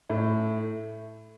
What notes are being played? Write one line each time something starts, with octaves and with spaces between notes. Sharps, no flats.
A2 A3